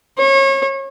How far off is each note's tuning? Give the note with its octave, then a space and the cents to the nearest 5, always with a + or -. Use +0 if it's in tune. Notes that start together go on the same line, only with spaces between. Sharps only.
C#5 -30